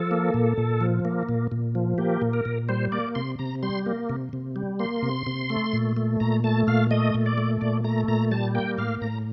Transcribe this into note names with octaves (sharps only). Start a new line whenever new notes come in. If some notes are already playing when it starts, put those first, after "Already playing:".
Already playing: F3 A4
A#3
A#2
A#2
F3
A#3
A#2
A#2
F3
A#3 G4
A#2
A#4
A#2
G3 C5
A#3 D5
C3 C6
C3 A#5
G3 C6
A#3
C3
C3
G3
A#3 C6
C3
C3
A3
A#2
A3
A#2 A#5
A3 A5
A#2 F5
A3 D#5
A#2
D5
A3
A#2 D5
A3 A#5
A#2 A#5
G3 A5
A#3 G5
A2 F5
A2 A#5